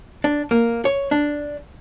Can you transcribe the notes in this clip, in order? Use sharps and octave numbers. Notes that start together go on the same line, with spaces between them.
D4
A#3
C#5
D4